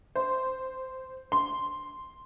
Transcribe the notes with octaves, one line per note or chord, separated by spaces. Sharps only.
C5
C6